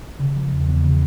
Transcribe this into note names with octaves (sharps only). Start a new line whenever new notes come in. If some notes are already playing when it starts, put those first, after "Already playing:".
C#3
F3
E2
E2
C#3